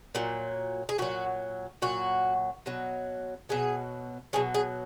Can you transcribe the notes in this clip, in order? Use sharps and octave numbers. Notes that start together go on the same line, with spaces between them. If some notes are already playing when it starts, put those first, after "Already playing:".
A#2 F#3
G#4
A#2 F#3 F#4
A#2 F#3 F#4
B2 F#3
B2 F#3 G#4
B2 F#3 G#4
G#4